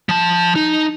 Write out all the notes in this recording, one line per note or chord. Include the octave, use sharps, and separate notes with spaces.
F3 A5
D#4